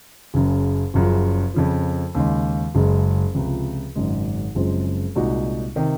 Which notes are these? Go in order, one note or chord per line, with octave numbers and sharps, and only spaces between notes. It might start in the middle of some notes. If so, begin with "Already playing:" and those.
F#1 F#2 C#3
F#1 F#2 C#3 F3
F2 C#3 F3
D#2 C#3 G#3
F#1 F#2 C#3 G#3
C#2 C3 F3
G#1 F#2 C#3 G#3
F#1 F#2 F3 G#3 C4
C2 A#2 G#3 D#4 F#4
C3 D#3